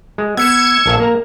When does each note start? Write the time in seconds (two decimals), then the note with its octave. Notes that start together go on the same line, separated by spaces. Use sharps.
0.18 G#3
0.37 B3 E6 G#6 C#7 E7
0.86 A#1 A4 F5
1.00 A#3 A#5